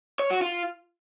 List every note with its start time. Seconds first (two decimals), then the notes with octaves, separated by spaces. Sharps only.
0.19 C#5
0.31 F#4
0.42 F4